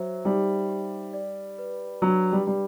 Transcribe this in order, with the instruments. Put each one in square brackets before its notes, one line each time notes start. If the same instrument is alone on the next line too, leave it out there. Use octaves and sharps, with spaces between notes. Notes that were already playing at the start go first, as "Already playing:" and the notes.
Already playing: [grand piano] F#3 [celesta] C5 E5
[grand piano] G3 [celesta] D#4
[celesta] G4
D5
B4
[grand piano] F#3 [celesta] D4
[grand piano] G3
[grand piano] G3 [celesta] G4